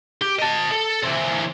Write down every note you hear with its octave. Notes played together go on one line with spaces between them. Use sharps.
G4
D#5 A5
A4
E3 C4